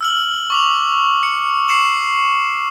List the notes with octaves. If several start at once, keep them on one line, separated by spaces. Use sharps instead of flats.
E6 F6 F#7
C#6 D6 F7
C#7
C#6 C7 C#7 E7 F#7